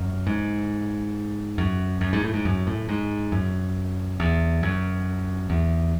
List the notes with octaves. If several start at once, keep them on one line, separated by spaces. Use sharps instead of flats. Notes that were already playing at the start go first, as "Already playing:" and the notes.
Already playing: F#2
G#2
F#2
F#2
G#2
A2
G#2
F#2
A2
G#2
F#2
E2
F#2
E2